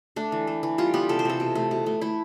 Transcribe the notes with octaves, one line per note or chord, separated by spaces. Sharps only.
A3 D4
E3
A3
E3
G3 F4
B3 G4
C3 A4
C5
C3 A4
B2
A3
B2
A3
A3 E4